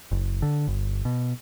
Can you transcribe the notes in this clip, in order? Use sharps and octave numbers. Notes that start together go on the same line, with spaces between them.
F#1
D3
G1
B2